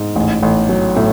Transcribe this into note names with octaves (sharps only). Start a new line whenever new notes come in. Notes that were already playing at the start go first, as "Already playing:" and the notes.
Already playing: G#2
A1
A1
F#3
A2